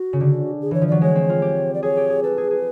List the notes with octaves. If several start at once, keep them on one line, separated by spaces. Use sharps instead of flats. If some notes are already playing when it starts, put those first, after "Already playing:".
Already playing: F#4
C#3
D3
G#4
E3 C#5
F3
F#3 D5
G#3 C#5
C4
F4
G4
D5
G#4 C#5
G4
G#4
A4 B4
G#4
G#4